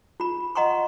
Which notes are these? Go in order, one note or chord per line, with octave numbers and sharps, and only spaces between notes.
F4 B5
D#5 F#5 A#5 C6 C#6